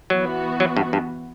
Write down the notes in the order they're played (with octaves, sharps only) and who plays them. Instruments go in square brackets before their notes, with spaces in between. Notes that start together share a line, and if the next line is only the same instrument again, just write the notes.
[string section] E3 B3 F#4 [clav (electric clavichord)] F#3
[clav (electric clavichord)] F#3
G2
G2